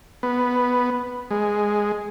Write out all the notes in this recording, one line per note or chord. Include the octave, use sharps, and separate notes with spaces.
B3
G#3